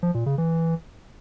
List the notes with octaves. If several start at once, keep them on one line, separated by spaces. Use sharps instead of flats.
F3
A#2
C#3
E3